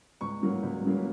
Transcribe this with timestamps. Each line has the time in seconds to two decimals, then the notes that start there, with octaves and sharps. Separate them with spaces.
0.21 C#2 C#6
0.42 C#3 F#3 A#3
0.63 C#2
0.84 C#3 F#3 A#3